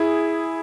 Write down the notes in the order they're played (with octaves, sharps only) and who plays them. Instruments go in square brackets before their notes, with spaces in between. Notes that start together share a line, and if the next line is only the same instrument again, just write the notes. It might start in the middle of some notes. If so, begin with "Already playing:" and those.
Already playing: [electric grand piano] E4 G#4